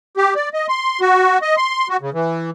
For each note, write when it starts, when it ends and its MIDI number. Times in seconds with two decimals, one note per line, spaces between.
0.17 0.34 67
0.35 0.49 74
0.54 0.67 75
0.69 1.00 84
1.01 1.38 66
1.42 1.56 75
1.57 1.88 84
1.89 1.97 66
2.01 2.10 49
2.14 2.50 52